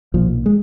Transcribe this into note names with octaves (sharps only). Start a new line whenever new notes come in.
B1 A#2 F3
G#3